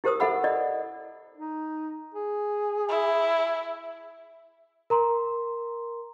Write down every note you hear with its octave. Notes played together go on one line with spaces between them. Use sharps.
E4 G4 A#4 C5 D#6 E6
E4 A4 E5 F#5 B5 E6
E4 D5 D#5
D#4
G#4
E4
A#4 A#5 C6